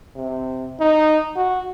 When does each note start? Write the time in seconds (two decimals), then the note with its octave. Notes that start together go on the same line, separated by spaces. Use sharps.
0.16 C3
0.80 D#4
1.36 F#4